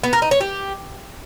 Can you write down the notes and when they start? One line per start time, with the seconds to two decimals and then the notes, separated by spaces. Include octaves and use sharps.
0.03 B3
0.13 A#4
0.22 D#4
0.31 C#5
0.41 G4